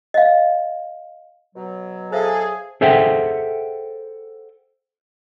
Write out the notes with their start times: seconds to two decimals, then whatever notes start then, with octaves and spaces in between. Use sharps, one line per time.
0.14 D#5 F5
1.56 B2 F#3
2.12 G#4 A4 C5 E5 F5
2.81 G#4 A4 C5 E5 F#5 G5